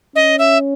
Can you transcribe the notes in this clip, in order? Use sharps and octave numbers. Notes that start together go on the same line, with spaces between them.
C#4 D#5
E5